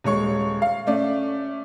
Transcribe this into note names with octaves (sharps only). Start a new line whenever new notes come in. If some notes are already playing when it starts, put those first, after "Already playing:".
D#1 G#3 C#5 C#6
F5
A3 C#4 D5